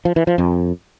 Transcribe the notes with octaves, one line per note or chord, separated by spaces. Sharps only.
F3
E3
F3
F2